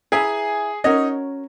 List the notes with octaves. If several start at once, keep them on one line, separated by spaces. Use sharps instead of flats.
E4 G#4 B4 E5 G#5 A#5
C#4 D#4 F#4 A#4 C#5 D#5